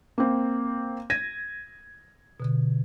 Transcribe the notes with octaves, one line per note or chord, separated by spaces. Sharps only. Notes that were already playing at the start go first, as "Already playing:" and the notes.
A#3 C4
G#6 A#6 D#7
B2 D3